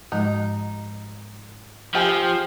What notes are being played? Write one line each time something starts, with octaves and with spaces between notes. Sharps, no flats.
G#2 F3 G#3 D#4
F3 C4 G4 G#4 G5